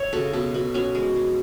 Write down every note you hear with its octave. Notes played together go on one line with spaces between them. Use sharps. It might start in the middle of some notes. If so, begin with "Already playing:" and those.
Already playing: C#5 E5
C#3 F#4 A4
B2 F#4 A4
B2 F#4
C#4 F#4
G#3
G#3